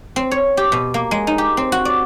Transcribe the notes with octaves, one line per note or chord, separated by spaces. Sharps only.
C4
C#5
G4
B2
A#3
G#3
D#4
G4
C4
F#4
D5